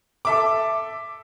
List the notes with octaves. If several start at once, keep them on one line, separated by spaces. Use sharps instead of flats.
A4 E5 D6